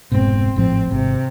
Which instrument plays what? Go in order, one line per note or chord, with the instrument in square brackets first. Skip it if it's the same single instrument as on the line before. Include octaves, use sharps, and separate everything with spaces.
[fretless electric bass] F1 G#2 B2 [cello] C4
[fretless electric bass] G#1 A2 F3 [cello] C4
[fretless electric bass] G#1 [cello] C3